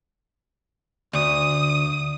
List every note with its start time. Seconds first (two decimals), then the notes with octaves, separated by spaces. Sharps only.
1.13 D2 D#6